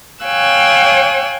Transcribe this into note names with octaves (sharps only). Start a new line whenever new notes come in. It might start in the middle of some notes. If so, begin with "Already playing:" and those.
C#5 F5 G5 G#5 E6 F#6